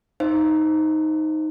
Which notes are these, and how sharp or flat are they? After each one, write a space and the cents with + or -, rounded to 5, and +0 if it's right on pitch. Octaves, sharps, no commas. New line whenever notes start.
D#4 +5 C5 +0 F5 -40